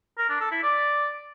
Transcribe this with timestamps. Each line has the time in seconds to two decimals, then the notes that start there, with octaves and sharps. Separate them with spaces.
0.18 A#4
0.29 D4
0.40 A4
0.51 E4
0.63 D5